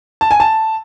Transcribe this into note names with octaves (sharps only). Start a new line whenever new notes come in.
A5
G#5
A5